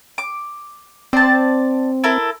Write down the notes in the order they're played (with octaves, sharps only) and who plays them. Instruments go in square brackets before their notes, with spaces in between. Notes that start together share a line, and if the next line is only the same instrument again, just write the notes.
[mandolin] D6
[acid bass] C4 [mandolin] D5 A5
[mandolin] E4 A4 A#4